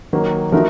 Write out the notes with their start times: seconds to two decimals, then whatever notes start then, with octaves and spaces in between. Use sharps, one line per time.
0.13 D#3 F#3 A#3 D#4
0.52 F3 A3 D#4 F#4 A#4